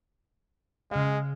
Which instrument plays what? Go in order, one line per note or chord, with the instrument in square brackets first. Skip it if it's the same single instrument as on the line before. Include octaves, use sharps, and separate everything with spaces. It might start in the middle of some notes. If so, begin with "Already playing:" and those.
[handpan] C#3 F5 [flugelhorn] G#3